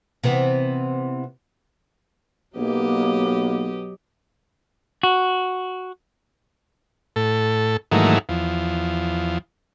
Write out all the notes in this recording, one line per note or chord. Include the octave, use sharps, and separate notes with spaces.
C3 E3 B3
B1 F#3 A#3 B3 G4 D#5
F#4
A2 A4
G#2 D#3 E3 F#3 A3 A#3
E2 F3